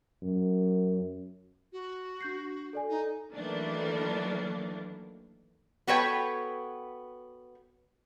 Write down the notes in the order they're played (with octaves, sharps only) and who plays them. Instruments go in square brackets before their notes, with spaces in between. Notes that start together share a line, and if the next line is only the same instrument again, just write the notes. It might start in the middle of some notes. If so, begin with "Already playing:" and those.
[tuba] F#2
[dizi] F#4
[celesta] D4 G6 C7
A4 D5 G#5
[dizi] D#4
[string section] D#3 E3 F#3 A3 A#3 D4
[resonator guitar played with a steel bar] B3 F#4 A4 B4 C#5 G5